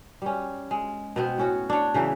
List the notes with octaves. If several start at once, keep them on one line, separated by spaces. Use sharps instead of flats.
G3 C#4
G#3
B2 B3 C4
A2 C#4 F#4
D4 C#5
C#3 E3 F#3 E4